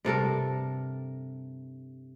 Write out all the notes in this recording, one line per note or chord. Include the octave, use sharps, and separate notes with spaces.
G2 C3 A4 A#4